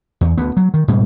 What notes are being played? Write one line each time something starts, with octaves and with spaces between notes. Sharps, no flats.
E2
D2 B3
F#3
D#3
G#2 B2 G3